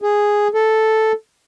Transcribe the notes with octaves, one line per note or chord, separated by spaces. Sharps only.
G#4
A4